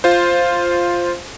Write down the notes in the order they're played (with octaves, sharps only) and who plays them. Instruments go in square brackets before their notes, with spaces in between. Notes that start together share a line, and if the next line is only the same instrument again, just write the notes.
[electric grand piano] F4 C5